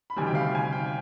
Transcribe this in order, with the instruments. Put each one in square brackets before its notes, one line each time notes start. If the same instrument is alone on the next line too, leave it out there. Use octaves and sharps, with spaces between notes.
[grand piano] B5
D2 C3 D#3 G3 G#5
G5
F5
G#5
G5